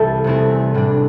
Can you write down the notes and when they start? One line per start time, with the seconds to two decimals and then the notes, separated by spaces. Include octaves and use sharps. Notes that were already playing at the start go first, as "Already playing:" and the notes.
Already playing: C2 E3 G3 E4 A4 E5 A5
0.24 E2 C3 A3 C4 E4
0.74 A2 G3 D4